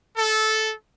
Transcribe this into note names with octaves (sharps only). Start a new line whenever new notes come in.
A4